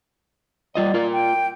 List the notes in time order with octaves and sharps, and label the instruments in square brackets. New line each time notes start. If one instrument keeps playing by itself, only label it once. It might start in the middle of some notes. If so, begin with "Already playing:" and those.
[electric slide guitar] G3 F4 D#5 [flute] D5
[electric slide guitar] F4 A#4
[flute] G5